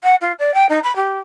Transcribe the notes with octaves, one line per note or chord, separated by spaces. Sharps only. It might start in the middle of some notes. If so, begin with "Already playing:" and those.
F#5
F4
D5
G5
D#4
B5
G4